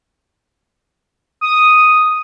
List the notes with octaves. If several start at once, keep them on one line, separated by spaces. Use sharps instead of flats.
D#6